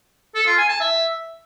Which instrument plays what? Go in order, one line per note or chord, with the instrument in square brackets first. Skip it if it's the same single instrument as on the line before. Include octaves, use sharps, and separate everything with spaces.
[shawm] A4
F4
G#5
A5
E5